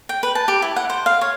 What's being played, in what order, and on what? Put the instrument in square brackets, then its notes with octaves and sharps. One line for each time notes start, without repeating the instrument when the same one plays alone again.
[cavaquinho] G5
B4
A5
G4
E4
F#5
C5
F5
C#5